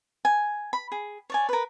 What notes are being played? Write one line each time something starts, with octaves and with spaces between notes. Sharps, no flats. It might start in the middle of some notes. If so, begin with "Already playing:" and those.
G#5
B5
G#4
C#5 D5 G#5
A#4 B4